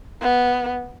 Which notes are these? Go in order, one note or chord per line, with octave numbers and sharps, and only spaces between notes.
B3